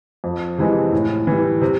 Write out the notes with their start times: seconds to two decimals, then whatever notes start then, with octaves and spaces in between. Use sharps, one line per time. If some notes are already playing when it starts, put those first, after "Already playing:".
0.24 F2
0.58 C3 E3 G#3
0.93 A2
1.27 E3 G3
1.61 C3